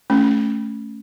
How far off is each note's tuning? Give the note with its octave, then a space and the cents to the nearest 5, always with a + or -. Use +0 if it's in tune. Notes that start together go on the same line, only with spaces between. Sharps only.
A3 +0 C#4 +0